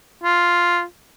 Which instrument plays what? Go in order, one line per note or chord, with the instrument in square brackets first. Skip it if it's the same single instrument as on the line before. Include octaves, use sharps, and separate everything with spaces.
[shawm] F4